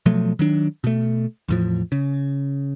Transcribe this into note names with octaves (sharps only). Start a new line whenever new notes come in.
B2 F3 F#3 A3
D#3 F#3 D4
B2 A3
E2 A2 F3
C#3